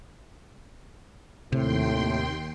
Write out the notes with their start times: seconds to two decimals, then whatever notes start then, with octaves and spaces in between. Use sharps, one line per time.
1.52 D#2 A2 C3 G5 C6